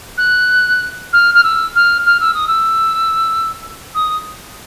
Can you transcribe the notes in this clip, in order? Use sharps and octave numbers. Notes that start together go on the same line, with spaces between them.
F#6
F6
F6
E6
F6
F6
E6
D#6
E6
D#6